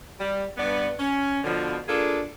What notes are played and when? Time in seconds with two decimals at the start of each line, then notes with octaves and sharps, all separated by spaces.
0.20 G3
0.58 G2 B3 D5
0.99 C#4
1.44 B2 D3 F3
1.88 A#3 D4 F4 G#4 A4